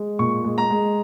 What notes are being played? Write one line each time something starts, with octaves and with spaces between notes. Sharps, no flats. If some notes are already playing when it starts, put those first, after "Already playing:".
Already playing: G#3
A#2 C#6
G#3
A#5
G#3